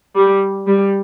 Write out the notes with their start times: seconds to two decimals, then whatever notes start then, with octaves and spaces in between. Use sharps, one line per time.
0.15 G3
0.67 G3